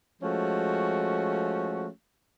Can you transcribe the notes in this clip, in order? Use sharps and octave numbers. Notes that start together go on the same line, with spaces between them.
F3 G#3 A3 C#4 F#4